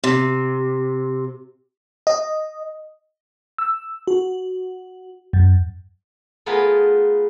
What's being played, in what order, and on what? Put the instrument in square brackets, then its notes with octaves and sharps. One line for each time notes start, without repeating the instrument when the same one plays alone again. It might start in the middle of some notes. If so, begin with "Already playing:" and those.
[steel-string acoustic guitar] C3
[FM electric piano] D#5
E6
F#4
F#2
[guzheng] A3 B3 F4 G#4 A#4 B4